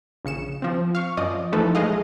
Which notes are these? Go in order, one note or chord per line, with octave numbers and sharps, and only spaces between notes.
A#1 C#3 C#7 E7
F3 C4
F5 C#6
F#2 F3 D5 D#5 D#6
E3 F3 A3 D#4 A4 B4
A#1 G#3 A3 G#4 D#5 F5